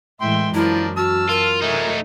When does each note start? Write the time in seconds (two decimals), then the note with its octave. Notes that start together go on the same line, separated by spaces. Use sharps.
0.21 A2 E3 G#3 E5 G5 C6
0.54 F#2 F3 D4 E4 A#4
0.97 F#4 A5 E6 F6
1.29 F4 A#4
1.62 F#3 G#3 A3 D#4 E4